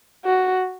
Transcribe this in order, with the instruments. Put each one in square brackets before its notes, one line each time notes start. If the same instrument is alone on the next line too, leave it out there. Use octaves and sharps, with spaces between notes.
[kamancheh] F#4